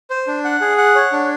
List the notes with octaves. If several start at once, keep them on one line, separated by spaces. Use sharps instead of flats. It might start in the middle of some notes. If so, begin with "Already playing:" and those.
C5
D4
F#5
G#4
F#5
C#5
D4